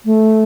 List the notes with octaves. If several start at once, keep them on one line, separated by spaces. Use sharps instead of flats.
A3